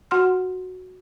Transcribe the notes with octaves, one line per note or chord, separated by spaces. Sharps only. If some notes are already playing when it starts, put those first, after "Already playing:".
F#4 F#5 C6 F6